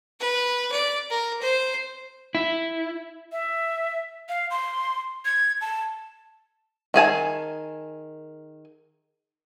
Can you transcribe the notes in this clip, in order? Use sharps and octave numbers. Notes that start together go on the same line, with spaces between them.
B4
D5
A#4
C5
E4
E5
F5
C6
G#6
A5
D#3 G#4 G#5 A5